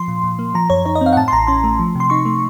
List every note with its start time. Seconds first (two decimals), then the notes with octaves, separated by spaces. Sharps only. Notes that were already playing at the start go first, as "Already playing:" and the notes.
Already playing: F3 C6
0.08 A#2
0.24 A#2
0.39 A#3
0.54 F3 A#5
0.70 F#2 C#5
0.85 D#4 C#5
0.95 D#5
1.01 C4
1.06 F5
1.13 F#5
1.17 A2 A5
1.28 C6
1.33 A1 A#5
1.47 C#4 C6
1.64 A3
1.80 F3
1.95 C3 C6
2.10 D#4 C#6
2.25 A3